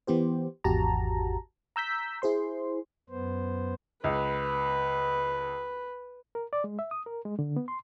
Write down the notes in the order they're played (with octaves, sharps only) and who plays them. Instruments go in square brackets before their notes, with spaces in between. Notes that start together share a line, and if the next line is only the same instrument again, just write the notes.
[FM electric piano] E3 B3 G4 C5
G#1 E2 F#4 G4 A5 A#5
A#5 E6 G6 B6
E4 G#4 C5 C6
[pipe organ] F#2 B3 C5
[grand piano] C#2 [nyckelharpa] B4
[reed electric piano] A#4
D5
G#3
E5
D#6
A#4
G#3
D3
B3
C6